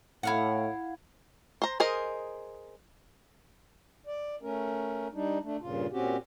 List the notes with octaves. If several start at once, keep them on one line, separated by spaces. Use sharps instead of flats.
A2 E4 F5 F#5
C5 A#5
G#4 A#4 C5 D#5
D5
A3 C#4 A#4
G3 D4 D#4
A3 D4
G2 A#2 C#3 F4
A#2 C4 C#4 F#4 G4